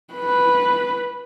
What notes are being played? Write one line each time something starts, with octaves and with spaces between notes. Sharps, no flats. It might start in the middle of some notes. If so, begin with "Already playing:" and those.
B4